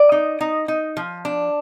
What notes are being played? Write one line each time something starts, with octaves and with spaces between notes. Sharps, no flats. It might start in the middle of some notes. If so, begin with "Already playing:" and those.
Already playing: D5
D#4
D#4
D#4
F3
D4